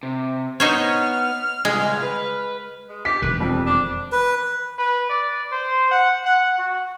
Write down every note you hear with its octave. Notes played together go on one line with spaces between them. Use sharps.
C3
B3 D#4 C5 C#5 F6
C2 G#3 G#4
C#2
B4
G#3
G4 B6
E1 D#3 B4
F2 G3
D4
B4
B4
D5
C5
F#5
F#5
F#4